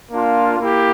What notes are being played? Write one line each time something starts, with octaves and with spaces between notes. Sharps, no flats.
A#3 D4 F4
A#3 E4 G4